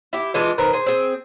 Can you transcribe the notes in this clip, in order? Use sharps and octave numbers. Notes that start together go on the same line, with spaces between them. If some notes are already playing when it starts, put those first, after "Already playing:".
E4 G4
E3 G#3 D4 F4
D#3 C4 A#4 B4
G#4 C5
C4 G#4